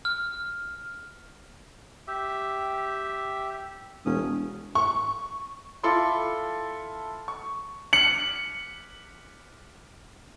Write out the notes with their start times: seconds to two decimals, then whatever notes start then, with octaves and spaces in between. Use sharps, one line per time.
0.05 F6
2.07 G4 E5
4.06 E1 C#4 D#6
4.75 C#6
5.83 E4 F4 A4 B5 C6 D6
7.28 C#6
7.93 C#7 F#7